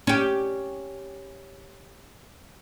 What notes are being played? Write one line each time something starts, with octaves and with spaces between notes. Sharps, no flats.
C#4 G4